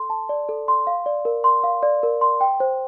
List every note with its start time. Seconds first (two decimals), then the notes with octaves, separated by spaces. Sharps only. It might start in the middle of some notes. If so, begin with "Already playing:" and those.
Already playing: A4 C6
0.10 A5
0.29 D5
0.49 A4
0.68 C6
0.87 F5
1.06 D5
1.25 A#4
1.44 C6
1.64 F5
1.83 D5
2.03 A#4
2.21 C6
2.41 G5
2.60 C5